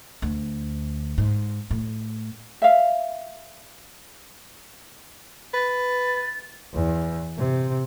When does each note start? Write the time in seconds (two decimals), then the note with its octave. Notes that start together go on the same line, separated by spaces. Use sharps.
0.22 D2
1.18 G#2
1.71 A2
2.62 E5 F5
5.54 B4 A6
6.73 E2
7.38 C3